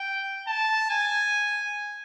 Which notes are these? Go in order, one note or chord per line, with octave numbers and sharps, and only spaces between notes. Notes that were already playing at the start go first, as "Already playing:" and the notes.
Already playing: G5
A5
G#5